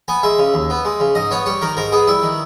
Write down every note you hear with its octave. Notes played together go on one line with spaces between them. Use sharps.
B3 G#5
G#3 E5
C#3
D#2
B3
G#3
C#3
G#2 D#5
B3 C#5
G3 C#5
D#3 A#4
G#2 A#4
B3 G#4
G3 E4
D#3